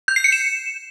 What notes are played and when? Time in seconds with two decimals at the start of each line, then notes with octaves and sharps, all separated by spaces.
0.08 G6
0.16 C7
0.24 C#7
0.32 E7